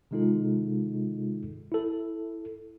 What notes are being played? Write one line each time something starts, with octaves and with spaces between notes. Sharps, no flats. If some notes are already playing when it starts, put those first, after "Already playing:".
C3 D#3 G#3 D#4 F4 A4
E4 A4